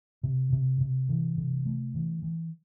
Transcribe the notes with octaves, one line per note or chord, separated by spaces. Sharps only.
C3
C3
C3
E3
C3
A3
E3
E3